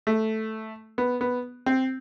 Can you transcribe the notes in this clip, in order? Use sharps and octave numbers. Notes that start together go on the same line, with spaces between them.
A3
B3
B3
C4